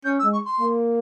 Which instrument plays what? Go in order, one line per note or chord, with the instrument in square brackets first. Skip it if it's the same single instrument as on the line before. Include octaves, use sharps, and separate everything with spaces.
[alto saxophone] C#4 [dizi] G6
[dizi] E6
[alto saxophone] G#3
[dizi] C#6
C6
[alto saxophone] A#3